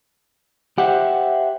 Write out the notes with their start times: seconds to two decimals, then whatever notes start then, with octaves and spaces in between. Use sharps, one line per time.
0.78 G4 C5 E5 F#5